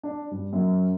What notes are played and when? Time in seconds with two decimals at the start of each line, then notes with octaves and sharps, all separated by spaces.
0.03 D4
0.31 G2
0.53 F#2